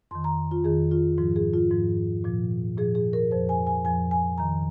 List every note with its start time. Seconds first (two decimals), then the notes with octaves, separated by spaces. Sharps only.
0.11 F2 D#3 C6
0.24 A#5
0.51 F4
0.64 F2 D#3 G#4
0.91 F4
1.18 G#2 F3 F4
1.36 G#4
1.54 F4
1.71 G#2 F3
2.24 A#2 F3
2.78 A#2 F3 G#4
2.95 G#4
3.13 A#4
3.31 F2 F3 C5
3.49 G#5
3.67 G#5
3.84 F2 F3 G#5
4.11 G#5
4.38 F2 D#3 A#5